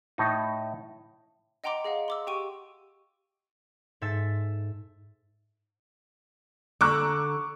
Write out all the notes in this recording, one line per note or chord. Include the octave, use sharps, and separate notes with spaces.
A2 D#4
D#5 F#5 G5 A#5 C6 D6
G#4 D#5 F5 F#5
C6 D6 E6
G4 G5 C#6 D#7
G#2 A4 E5 A6
D3 A#5 C#6 D6 E6 F#6